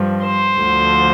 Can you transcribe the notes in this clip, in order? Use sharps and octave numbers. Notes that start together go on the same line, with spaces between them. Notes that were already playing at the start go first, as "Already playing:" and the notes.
Already playing: G2 F3
C5
D2 D3 F3